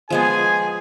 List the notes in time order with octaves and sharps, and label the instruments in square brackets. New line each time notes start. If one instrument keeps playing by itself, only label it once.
[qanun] F3 G#3 B3 [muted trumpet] G#4 [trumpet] G#5